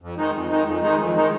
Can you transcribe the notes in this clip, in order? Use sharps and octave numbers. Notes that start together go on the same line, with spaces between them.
F2
D#3 G#3 D#4
F2
D#3 G#3 D#4
F2
D#3 G#3 D#4
F2
D#3 G#3 D#4